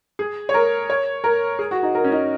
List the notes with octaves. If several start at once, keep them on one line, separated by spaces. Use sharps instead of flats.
G#4
C#5
A#4
C#5
A#4
G#4
F#4
D#4
A#4
C#4
D#4